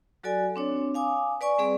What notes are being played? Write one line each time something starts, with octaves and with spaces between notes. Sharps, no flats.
F#3 F#4 A4 D5 G#5
C4 D4 C#5
F5 G#5 D6 D#6
B4 D5 G#5 C#6
G3 C4 G#4 D5